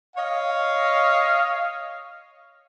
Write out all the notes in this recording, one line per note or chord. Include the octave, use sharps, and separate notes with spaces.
C#5 D#5 F5